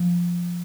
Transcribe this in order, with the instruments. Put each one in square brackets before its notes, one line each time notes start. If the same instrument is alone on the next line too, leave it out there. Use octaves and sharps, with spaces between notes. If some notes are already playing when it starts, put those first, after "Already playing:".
Already playing: [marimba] F3